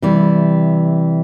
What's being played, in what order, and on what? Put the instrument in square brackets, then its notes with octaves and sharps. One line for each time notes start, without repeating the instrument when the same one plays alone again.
[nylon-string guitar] C3 E3 G3